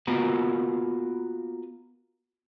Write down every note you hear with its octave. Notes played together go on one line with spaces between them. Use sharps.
A#3 B3 F4 F#4 A#4 B4